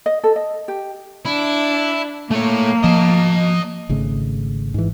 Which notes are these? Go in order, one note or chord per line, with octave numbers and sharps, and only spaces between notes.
D#5
A4
D#5
G4
D4 E4
A3 A#3 C#5
F3 D#5 A5
G#1 C#3 A3
G#2 E3